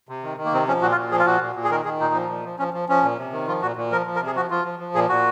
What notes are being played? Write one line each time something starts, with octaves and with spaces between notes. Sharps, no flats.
C3
D#3
D#3
A#3
C3 C4
F3 C#4
A#2 F#4
F4
A#2
F3 G#4
F4
A#2 F#4
A#2
A#2
G#4
D#3 A#4
D#3 G#4
A#2 D#4
F3
A#2
F3
F3 C#4
F3
F3 C#4
A#2
C3
D#3
F3 F4
A#2 F#4
A#2
F3 A#4
F3
A#4
C3
G#4
F3 F#4
F3 F4
F3
F3
A#2 G#4
A#2 F#4